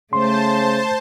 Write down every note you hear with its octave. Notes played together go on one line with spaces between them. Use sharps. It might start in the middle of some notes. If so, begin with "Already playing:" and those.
C#3 A3 C5 A5 C6